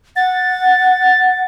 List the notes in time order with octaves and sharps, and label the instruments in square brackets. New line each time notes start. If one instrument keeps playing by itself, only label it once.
[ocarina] F#5 [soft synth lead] A6